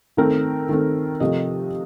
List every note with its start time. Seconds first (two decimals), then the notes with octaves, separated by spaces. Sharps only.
0.17 D#3 A3 C4 A#4
0.69 D#3 A3 C4
1.20 C3 F3 A3 C4 D#5